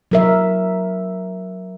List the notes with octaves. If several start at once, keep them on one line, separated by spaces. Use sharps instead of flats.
F#3 A#4 E5